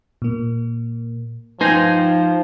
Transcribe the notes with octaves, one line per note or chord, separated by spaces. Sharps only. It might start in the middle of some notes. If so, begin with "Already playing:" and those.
A#2 A#3
F3 D#4 B4 C5 G5 G#5